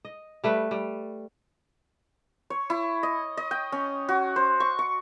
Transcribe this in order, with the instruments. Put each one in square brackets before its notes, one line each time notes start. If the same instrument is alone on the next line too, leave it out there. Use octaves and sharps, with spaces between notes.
[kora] D#5
G3 A3 B4
G3
[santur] C#5
E4
D#5
D#5
G5
C#4
F#4
C5
C#6
C#6